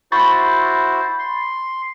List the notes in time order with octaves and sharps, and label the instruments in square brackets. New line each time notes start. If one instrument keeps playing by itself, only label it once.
[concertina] E4 F#4 C5 [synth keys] B5 C#6 A6
[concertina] C6